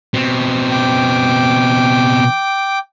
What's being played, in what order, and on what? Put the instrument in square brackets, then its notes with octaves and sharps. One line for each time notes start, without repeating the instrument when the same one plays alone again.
[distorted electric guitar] B2 C4
[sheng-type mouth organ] G5 D6